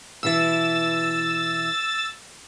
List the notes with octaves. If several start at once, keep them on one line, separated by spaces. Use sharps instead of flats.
B2 E3 E4 E6 A6